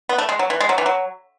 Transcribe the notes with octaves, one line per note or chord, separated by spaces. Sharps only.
B3
A3
G#3
F#3
E3
G#3
F#3
E3
F#3